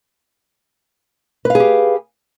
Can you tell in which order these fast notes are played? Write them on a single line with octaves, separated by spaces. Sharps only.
B4 F5 G#4 G4